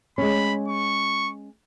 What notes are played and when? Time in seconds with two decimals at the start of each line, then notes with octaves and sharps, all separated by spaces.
0.18 G#3 C#4 B5
0.68 C#6